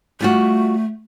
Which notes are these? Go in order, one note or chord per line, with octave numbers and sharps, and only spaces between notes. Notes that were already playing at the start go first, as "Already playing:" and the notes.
G3 A3 F4 F#4